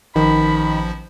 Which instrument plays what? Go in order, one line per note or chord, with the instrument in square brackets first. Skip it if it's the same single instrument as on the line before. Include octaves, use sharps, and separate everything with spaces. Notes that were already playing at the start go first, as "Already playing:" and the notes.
[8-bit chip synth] A1 F3 [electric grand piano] D#3 [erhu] B5